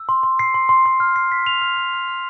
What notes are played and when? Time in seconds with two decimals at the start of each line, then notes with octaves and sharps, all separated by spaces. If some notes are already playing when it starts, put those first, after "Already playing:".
Already playing: E6
0.09 C6
0.23 C6
0.39 C7
0.54 C6
0.69 C6
0.86 C6
1.00 F6
1.16 C7
1.32 B6
1.47 F7
1.62 F6
1.77 F6
1.94 F6
2.08 F6